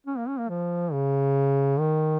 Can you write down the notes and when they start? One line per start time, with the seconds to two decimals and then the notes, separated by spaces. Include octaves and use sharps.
0.07 C#4
0.18 A#3
0.28 C#4
0.39 A#3
0.49 F3
0.93 C#3
1.79 D#3